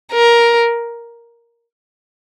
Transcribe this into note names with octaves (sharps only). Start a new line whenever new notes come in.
A#4